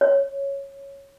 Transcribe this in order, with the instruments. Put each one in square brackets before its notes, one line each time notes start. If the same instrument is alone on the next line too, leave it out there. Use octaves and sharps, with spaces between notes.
[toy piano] C#5